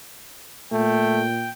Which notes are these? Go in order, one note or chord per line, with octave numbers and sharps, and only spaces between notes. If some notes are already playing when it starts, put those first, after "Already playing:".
A#2 A3 G5